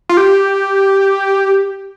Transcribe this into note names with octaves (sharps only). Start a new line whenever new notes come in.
F4
G4